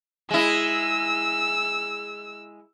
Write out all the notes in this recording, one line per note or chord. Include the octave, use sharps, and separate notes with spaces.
G#3 E4 E6